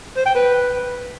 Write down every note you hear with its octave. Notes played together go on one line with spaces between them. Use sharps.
C5
G5
B4